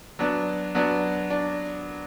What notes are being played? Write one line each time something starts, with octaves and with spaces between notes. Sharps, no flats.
F#3 B3 D4
F#3 B3 D4
D4